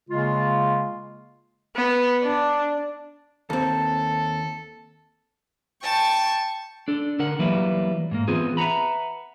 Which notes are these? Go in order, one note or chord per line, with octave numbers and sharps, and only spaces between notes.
C#3 G#3 A#3 F4
B3
D4
D#2 C4 A4
G5 A5 C#6
D4 A4
D3 A#4 F#5
E3 F#3 G3 A#3 E4 B4
G#2 A#3
E3 B3 C4 F4 G#4
B4 E5 F#5 A#5 B5